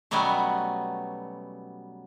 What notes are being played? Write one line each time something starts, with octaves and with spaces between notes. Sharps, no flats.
B2 F#3 G3 A3 B3 C#4